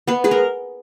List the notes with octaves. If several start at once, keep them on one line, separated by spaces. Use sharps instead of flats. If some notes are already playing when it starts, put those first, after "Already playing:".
B3 B4
G#3 B4
A#4